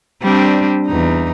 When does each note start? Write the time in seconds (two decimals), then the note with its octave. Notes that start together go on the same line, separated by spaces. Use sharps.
0.22 G3 C4 D4
0.87 E2 D#4